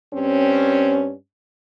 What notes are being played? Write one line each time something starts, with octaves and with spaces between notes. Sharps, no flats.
G2 C4 C#4